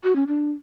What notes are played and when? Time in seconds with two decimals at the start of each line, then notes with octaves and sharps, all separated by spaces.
0.04 F#4
0.16 C#4
0.27 D4